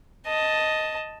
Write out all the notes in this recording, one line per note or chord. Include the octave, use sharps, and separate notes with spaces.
D#5 A5